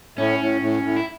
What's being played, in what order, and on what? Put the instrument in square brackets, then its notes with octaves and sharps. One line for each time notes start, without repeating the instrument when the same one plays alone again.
[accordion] A2 [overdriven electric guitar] C#4
[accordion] A2
A2
A2
[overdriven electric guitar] E4